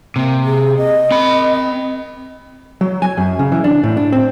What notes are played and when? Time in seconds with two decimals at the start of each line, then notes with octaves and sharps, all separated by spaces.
0.16 C3 A#3
0.45 G#4
0.77 D#5
1.11 C4 B5
2.81 F#3
3.02 G#5
3.18 F#2
3.39 C#3
3.52 E3
3.64 D4
3.83 A2
3.97 D4
4.12 C4